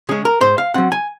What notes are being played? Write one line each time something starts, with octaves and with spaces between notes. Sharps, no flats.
C#3 G#3 C#4 G#4
A#4
G#2 C5
F5
F#3 C4 F#5
G#5